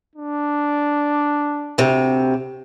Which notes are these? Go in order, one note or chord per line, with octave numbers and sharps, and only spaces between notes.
D4
D2 C3